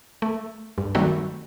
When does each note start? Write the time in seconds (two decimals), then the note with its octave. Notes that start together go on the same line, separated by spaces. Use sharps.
0.22 A3
0.78 G2
0.95 D#3 F#3 G3 A3 C4 F#4